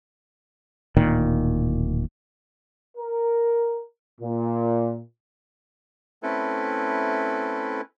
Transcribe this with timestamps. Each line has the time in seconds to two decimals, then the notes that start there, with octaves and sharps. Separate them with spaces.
0.97 D1 A#2 D#3
2.98 A#4
4.21 A#2
6.23 A3 C4 C#4 E4 A4 B4